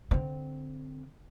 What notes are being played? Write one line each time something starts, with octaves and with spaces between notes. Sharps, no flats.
D3 C4